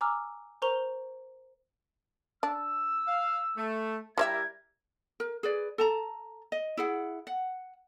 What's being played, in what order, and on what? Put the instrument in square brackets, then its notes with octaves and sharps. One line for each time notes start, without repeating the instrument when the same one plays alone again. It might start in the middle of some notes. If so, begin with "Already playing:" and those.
[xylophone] G#5 A#5 D6 E6 F6
A#4 C5 A#5 C#6 F7 G7
[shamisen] D4 [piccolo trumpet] E6
[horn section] F5
A3
[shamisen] G3 C5 E5 [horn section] E4 G4 A#4 [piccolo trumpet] G#6
[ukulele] A#4
G#4 B4 D5
A4 A5 A#5
D#5
E4 G#4 F#5
F#5